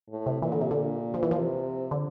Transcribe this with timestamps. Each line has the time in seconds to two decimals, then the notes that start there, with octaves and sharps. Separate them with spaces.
0.10 A2
0.26 C3
0.42 A#2 E3
0.52 D3
0.61 C3
0.71 A#2 D3
1.14 F3
1.23 E3
1.31 F3
1.38 C3
1.91 D3